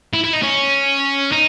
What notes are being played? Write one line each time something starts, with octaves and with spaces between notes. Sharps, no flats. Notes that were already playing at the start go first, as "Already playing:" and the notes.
E4
E4
D#4
C#4
D#4